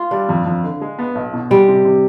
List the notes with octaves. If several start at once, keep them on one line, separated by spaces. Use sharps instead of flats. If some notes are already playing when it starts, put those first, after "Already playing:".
Already playing: F4
G3 D4
F2
F2
D3
G#3
B3
B1
B2
G3 G#3
C3
C3